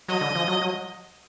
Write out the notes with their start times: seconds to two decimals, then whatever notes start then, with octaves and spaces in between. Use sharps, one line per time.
0.08 F#3 D#5
0.21 D3
0.35 F3
0.48 F#3
0.61 F#3